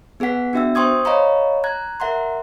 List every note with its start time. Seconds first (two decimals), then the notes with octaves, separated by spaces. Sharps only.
0.20 B3 G#4 B4 F#5 B6
0.53 B3 D4 F#4 E5 G5 E6
0.75 C5 G5 C6 C#6 D#6 G#6
1.05 C#5 D#5 F5 A#5 B5 C#6
1.64 A#5 F#6 G#6
2.00 A#4 E5 F#5 A#5 C6